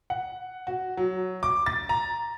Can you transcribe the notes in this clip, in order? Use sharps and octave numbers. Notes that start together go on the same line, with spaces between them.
F#5
F#4
F#3
D6
A6
A#5